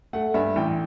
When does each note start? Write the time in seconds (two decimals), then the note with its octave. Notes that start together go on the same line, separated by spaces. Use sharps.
0.13 A3 F#5
0.34 G2 E5
0.56 A1 G5